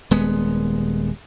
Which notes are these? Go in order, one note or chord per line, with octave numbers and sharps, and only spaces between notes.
D#1 G#3 B3